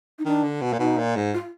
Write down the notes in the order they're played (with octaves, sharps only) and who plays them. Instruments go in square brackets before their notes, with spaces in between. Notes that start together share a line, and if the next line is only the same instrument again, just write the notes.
[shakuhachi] D#4
[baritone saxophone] D#3 [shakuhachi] D4
[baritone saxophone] D3
B2
A#2
[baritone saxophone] B2 [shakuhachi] D#4
[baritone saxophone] A#2
G#2
[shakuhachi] F4